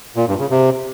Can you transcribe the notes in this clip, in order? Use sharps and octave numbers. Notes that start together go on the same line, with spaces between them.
A#2
G2
C#3
C3